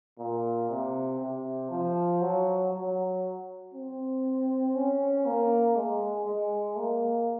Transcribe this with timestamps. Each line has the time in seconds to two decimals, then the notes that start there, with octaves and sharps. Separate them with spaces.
0.19 A#2
0.70 C3
1.20 C3
1.70 F3
2.21 F#3
2.73 F#3
3.74 C4
4.75 C#4
5.26 A#3
5.76 G#3
6.26 G#3
6.76 A#3